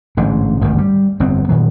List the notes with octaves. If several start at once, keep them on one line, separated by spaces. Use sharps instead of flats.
A1 G#2 D3
G#1 D2 G2 D#3
G3
G1 F2 B3 C4
A#2 D#3 F#3